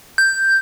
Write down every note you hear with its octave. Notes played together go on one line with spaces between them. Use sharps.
G6